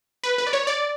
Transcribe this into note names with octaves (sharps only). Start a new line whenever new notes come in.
B4
B4
D5
C#5
D5